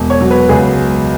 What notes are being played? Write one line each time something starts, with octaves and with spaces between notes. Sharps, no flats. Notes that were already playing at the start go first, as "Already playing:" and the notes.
Already playing: E1
C#5
F#3
B4
C#2 G#4